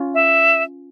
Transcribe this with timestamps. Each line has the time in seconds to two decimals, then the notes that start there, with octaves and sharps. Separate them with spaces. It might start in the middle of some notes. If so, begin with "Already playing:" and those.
Already playing: C#4 F4
0.14 E5